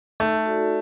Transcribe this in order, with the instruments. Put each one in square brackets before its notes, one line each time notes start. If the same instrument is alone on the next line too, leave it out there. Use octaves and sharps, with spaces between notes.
[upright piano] A3 [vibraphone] D#4
[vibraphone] F#4 A4 D5